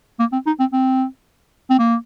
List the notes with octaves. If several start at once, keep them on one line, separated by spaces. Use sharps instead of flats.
A#3
C4
D#4
C4
C4
C4
A#3